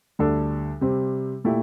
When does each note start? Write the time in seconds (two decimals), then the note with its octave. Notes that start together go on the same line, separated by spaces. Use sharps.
0.19 D2 D3 G3 D4 A4
0.81 C3 G3 C4
1.44 A#2 A3 E4 G4